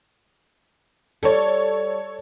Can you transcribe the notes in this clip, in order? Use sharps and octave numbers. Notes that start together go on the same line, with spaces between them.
G3 A4 C#5